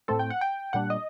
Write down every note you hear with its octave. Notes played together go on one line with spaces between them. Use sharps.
A2 A3 C4 A4
G5
F#5
G5
A#2 G3 D4 F#5
D#5